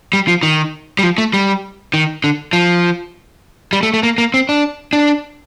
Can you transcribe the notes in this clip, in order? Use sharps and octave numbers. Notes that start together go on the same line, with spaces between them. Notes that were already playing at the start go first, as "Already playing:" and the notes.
G3
F3
D#3
G3
F3
A3
G3
D#3
D3
F3
G3
A3
A3
A#3
A#3
C4
D4
D4